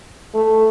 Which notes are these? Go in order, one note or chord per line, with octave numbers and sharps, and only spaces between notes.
A3